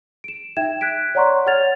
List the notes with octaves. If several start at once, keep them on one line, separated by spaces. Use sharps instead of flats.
D7 E7
D#4 E5 G5 G#6 E7
F#6 G#6 B6 D7
C#5 D5 F#5 A#5 C6 C#6
C#5 F#5 F6 G#6 A6 F7